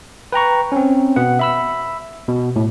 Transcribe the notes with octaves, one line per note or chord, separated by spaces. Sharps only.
B4 G5 A#5 C#6
C4 C#4
B2 B3 F#5
E5 B5 E6
B2
A2